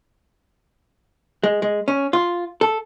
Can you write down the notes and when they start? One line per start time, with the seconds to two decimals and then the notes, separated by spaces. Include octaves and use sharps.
1.43 G#3
1.62 G#3
1.88 C#4
2.13 F4
2.61 A4